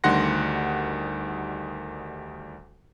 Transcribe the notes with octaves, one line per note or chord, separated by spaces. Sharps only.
D2 D#3 G3 F#5 C6 A#6